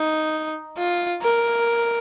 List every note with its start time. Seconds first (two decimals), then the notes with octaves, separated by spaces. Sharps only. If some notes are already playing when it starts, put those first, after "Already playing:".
Already playing: D#4
0.77 F4
1.22 A#4